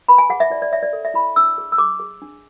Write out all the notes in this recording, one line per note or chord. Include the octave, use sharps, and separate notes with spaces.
B4 B5
G#5
G#4 F#5
E5
E4 D5
D5
C#5 E5
D5
A4
E5
E4 B5
D4 E6
G#4
E6
G#4 D6
G#4
D4